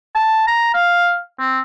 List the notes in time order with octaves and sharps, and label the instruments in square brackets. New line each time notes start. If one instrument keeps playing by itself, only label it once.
[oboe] A5
A#5
F5
C4